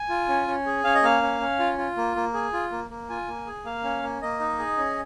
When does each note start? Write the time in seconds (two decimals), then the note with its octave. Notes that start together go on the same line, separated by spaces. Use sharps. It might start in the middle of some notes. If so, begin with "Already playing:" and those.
Already playing: G#5
0.09 F4
0.29 C#4
0.47 C#4
0.66 G#4
0.84 C#4 F5
0.95 D#5
1.03 A#3 F5
1.22 C#4
1.40 C#4
1.59 F4
1.78 F4
1.97 A#3
2.16 A#3
2.34 G#4
2.53 F4
2.72 A#3
2.90 A#3
3.09 F4 G#5
3.28 A#3
3.47 G#4
3.65 A#3 F5
3.84 C#4
4.03 A#3
4.22 A#3 D#5
4.40 D#4
4.59 G#4
4.77 C#4